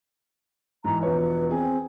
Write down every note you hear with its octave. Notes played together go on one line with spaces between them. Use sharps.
G#2 E3 A#5
E1 F3 B4 C#5
C4 G#4